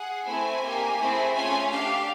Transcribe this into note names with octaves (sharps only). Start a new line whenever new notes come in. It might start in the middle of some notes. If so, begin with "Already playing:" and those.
Already playing: G#4 F#5
A3 C4 E4 G#5
A#3 D#4 G4
A3 C4 E4 G#4
A3 C#4 F4 G#5
D4 G4 F5